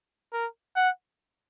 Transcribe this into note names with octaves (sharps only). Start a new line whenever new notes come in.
A#4
F#5